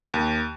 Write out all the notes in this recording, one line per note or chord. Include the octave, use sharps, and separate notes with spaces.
D#2